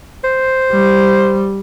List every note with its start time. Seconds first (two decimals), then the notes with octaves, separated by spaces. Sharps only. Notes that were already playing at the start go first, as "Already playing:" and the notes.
0.24 C5
0.72 G3